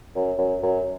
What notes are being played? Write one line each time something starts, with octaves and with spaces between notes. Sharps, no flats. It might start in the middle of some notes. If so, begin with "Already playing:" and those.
F#2
F#2
F#2